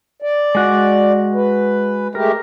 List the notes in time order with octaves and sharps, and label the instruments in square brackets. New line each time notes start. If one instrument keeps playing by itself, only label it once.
[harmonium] D5
[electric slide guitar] G#3 F#4
[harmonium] B4
[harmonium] G#3 A3 G4 [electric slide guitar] A#4